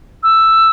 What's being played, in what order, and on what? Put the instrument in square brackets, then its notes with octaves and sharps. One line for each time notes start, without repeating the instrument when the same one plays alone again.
[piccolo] E6